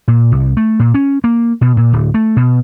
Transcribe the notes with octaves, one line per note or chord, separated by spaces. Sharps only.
A#2
C2
A3
A#2
C#4
A#3
B2
A#2
D1
A3
B2